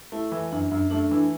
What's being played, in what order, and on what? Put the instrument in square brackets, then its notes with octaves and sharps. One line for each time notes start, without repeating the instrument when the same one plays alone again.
[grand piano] A3 [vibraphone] E4
[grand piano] E3
[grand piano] F#2 [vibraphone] D4
[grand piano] F#2
[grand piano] A3 [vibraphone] D4
[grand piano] E3